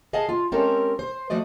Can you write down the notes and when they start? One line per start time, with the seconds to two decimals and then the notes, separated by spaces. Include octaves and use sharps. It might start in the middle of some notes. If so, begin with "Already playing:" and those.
0.13 G#4 D#5 F5 F#5 A5
0.29 F4
0.52 G#3 C4 C#4 G4 A4 A#4
0.99 C5
1.30 F3 A3 F#4 D5 D#5